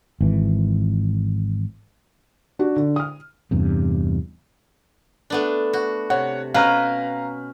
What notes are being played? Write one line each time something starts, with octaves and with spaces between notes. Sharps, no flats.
G#1 E3
D4 F#4
D3
D#6 F6
E2 G2 C3
A3 B3 D4
F#4
C3 C#5 F#5
B2 C#4 B4 F5 A#5 F6